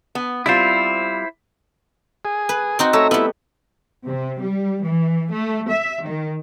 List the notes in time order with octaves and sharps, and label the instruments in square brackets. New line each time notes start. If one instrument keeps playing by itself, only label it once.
[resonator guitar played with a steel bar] B3
[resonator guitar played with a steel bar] G3 C4 F4 [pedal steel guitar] E4 C5
[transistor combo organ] G#4
[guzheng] B4
C4 D#4 F#4
[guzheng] A3 [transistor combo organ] C#5 E5 A#5
[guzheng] G3 B3 [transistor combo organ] E4
[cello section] C3
G3
E3
A3
E5
D#3